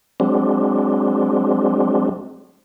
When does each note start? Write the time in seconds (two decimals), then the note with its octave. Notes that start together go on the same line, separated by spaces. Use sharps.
0.20 F#3 G#3 C4 D4